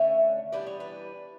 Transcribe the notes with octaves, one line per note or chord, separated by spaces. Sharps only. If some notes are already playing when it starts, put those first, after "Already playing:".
Already playing: D3 A3 C#4 C#5 E5
E3 G3 B3 D4 D5
C#5
B4 D5